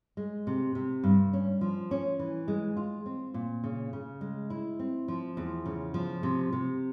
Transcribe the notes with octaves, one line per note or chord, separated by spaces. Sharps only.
G#3
C3
C3
G2
C#4
F3
C#4
E3
G#3
F4
C4
A#2
C#3
C#3
G#3
E4
C4
F3
E2
C#3
F3
C3
C3